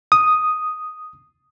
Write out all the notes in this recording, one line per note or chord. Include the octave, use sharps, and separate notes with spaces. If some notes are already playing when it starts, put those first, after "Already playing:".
D#6